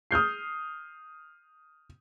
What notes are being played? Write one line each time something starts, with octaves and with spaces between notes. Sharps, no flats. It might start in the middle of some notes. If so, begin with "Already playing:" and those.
D#6 F6 G6 C7